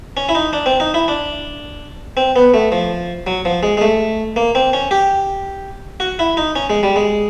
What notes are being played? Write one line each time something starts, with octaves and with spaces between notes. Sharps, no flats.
C#4
E4
D#4
D4
C4
D#4
E4
D4
C4
B3
A3
F3
F#3
F3
G#3
G#3
A3
A#3
C4
C#4
G4
F#4
E4
D#4
C#4
G#3
G3
G#3